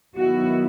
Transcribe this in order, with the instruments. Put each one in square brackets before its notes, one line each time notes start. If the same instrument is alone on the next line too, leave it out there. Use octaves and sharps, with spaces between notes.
[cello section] D#3 F#3 B3 E4 F#4